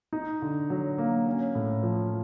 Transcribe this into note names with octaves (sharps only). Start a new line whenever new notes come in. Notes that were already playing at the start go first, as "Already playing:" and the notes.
D#4
D3
F#3
A#3
C#4
A2
F3